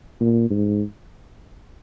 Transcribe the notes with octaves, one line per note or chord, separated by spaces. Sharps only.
A#2
G#2